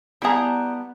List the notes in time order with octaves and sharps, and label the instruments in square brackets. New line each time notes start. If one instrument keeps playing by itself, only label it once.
[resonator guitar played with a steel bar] G3 A5 A#5 [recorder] B3 [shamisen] E4 G#4